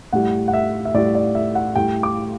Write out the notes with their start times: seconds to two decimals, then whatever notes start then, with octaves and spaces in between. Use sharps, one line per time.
0.13 A2 G3 F#5
0.48 F#5
0.54 E5
0.85 E5
0.94 A2 D5
0.98 G3
1.15 D5
1.35 E5
1.55 F#5
1.76 A2 G3 G5
2.03 D6